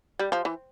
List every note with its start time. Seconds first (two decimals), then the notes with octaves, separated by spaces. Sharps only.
0.19 G3
0.32 F3
0.45 E3